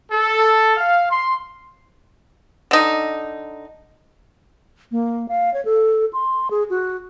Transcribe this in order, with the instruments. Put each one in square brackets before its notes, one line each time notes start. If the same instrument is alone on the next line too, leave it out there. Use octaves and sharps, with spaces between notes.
[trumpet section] A4
F5
C6
[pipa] D3 D#4
[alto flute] A#3
F5
C#5
A4
C6
G#4
F#4